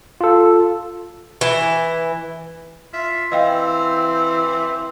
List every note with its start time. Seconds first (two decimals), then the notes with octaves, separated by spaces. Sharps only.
0.21 F4 A4
1.41 E3
2.93 F4 E5
3.32 E3 C4 D#5 F5 G5